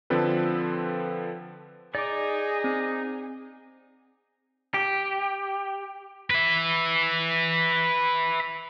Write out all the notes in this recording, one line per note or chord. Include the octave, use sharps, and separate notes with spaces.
D3 F3 C4 A4 B4
D#4 G#4 D5 D6
C4
G4
B4 E5